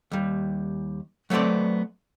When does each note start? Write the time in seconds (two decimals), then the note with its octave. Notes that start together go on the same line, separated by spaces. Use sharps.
0.11 D#2 G3
1.30 F#3 A3 B3 C4 D5